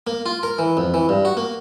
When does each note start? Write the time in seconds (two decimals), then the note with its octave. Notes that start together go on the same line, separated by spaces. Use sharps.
0.07 A#3
0.26 F4
0.43 A#4
0.59 E3
0.77 F2
0.94 E3
1.09 G2
1.25 F#4
1.37 A#3